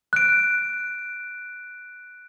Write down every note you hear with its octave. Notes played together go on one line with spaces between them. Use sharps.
F#6 D7